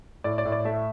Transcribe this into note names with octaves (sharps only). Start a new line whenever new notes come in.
A2 D5
D5
A2
D5
A3 E5